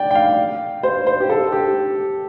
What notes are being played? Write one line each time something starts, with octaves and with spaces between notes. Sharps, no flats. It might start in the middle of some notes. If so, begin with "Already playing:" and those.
Already playing: D5 G5
G5
F5
C5
C5
G4
A4
G4